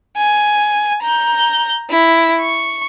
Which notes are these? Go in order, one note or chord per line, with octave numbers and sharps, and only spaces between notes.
G#5
A#5 G6
E4
C#6